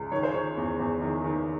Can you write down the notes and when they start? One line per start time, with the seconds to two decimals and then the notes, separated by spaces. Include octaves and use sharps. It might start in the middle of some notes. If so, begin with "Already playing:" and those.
Already playing: C#2
0.11 D#3 C#5
0.23 C5
0.34 D#3 C#5
0.57 E2
0.79 E2
1.01 D#3
1.24 D#3